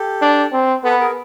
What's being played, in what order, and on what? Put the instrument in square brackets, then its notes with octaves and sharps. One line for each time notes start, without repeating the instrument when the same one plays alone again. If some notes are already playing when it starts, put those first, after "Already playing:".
Already playing: [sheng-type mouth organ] G4 A4
[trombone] D4
C4
[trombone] B3 [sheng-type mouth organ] A4 B4
[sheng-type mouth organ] G#4 A#4